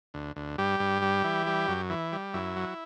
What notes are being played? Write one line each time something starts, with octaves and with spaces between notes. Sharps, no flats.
D2
D2
G2 G3 G4
G2
G3
E3
G3
F#2
E3
G3
F#2 E4
F#3